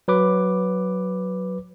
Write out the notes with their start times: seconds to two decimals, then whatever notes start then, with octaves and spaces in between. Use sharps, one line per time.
0.08 F#3 B4 D6